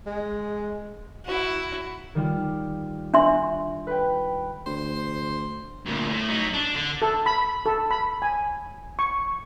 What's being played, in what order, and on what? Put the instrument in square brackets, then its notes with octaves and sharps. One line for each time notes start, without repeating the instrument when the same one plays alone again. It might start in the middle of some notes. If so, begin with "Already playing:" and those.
[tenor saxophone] G#3
[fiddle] E4 F#4
[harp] D#3 G3 F4
[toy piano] D4 E5 C6
[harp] B4 G5
[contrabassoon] D2 [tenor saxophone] C5
[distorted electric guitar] D2 A#2
A2
F#3 D#4
D4
D3
[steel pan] A4
B5
A4
B5
G#5
C#6